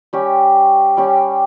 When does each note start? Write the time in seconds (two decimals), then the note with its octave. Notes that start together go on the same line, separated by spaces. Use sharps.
0.13 G3 C#4 G4
0.97 G3 C#4 G4